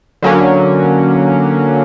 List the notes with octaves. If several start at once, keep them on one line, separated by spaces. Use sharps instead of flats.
D3 F#3 A#3 C#4